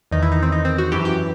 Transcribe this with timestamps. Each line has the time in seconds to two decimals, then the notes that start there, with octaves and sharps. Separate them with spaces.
0.11 E2 D#3 D#4
0.22 E4
0.32 D#4
0.42 C4
0.52 D#4
0.65 C4
0.78 F#4
0.92 F#2 E3 G4
1.05 G4